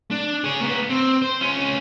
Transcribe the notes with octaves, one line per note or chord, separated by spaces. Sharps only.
D4
G#4 C#5
A#3 B3
C4
C5
C#4 F4